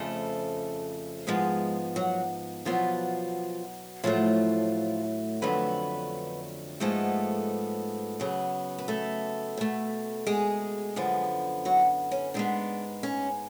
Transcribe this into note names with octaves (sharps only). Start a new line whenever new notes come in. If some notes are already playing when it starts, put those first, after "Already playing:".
Already playing: F2 C#3 F3 A3 A4
G#2 F3 G#3 B3 G#4
F#3 F#4
B2 F3 F#3 B3 F4
A2 F3 F#3 A3 F4
F2 D3 F#3 A3 B3 B4
G#2 F3 G#3 A3 B3 A4
C#3 F#3 B3
B4
A3 A4
B2 A3
G#3 G#4
F#2 D3 F3 B3
F#3 F#4
C#4
G#2 G#3 B3 D4
C#4